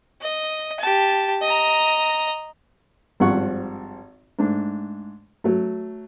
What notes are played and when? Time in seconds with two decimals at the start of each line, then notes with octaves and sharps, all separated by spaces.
0.21 D#5
0.80 G4 A5
1.42 D#5 A#5
3.20 G#1 G2 F3 C5 F#5 C#6
4.39 G#2 A3 D4
5.44 F#3 A3